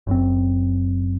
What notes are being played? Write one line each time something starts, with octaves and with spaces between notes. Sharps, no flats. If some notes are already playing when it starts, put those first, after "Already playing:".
F#1 F#2 C4